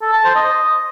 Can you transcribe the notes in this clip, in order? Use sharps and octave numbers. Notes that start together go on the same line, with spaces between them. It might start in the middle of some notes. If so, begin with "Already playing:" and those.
A4
A5
C5
D#5